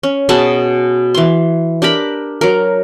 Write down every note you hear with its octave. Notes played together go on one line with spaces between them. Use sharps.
C#4
B2 B3 G#4 A5
E3 C6
D4 G4 A#4 B5
F#3 A#4